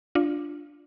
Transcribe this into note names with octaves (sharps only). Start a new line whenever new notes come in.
D4 F4